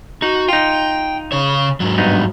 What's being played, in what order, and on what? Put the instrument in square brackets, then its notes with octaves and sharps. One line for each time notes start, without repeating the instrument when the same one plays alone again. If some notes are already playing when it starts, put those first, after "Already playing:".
[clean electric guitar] D#4 [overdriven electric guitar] F#4
[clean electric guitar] D#4 F4 [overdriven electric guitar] G5
[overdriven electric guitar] C#3 C#5
G#2 F#3
[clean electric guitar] G2 B3 D#4